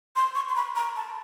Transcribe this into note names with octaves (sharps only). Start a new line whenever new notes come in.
C6
C#6
C6
B5
A#5
A5